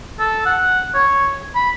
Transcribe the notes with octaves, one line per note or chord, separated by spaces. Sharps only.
A4
F#5
C#5
B5